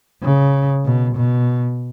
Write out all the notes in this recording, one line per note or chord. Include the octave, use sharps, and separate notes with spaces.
C#3
B2
B2